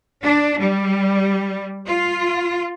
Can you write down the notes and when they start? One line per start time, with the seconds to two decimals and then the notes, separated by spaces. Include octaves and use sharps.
0.22 D4
0.59 G3
1.87 F4